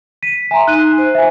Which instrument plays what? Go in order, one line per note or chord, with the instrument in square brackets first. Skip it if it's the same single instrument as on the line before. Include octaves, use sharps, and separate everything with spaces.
[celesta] B6 D#7
[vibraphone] E5 C6 [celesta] G#5 A#5
[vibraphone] D#4 [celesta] F#6 D#7
[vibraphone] C5
[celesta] E5 G#5